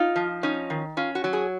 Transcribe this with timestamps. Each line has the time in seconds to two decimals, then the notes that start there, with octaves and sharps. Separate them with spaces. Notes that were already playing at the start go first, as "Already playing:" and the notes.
Already playing: D#4 F4
0.16 F3
0.43 C#4 D#4
0.70 D#3
0.97 C#4 F4
1.15 F#4
1.24 F#3
1.33 G#4